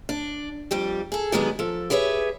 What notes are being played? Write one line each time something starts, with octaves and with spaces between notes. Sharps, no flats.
D4
F2 G3 G4
G#4 A4
D3 D#3 F#3 G#3 B3 G4
F3 A4
G4 G#4 B4 C#5 E5